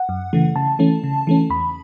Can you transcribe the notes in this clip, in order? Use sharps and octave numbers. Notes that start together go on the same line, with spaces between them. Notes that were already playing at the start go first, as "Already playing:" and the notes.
Already playing: F#5
F#2
C#3 E3 A3
C#3 A5
E3 A3 C#4
C#3
E3 A3 C#4
E2 B5